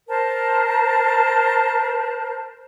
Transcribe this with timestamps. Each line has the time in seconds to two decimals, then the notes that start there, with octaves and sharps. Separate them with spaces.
0.08 A#4 C5 A5